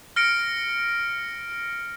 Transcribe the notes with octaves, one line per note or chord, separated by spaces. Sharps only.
F6 A#6 C#7 D7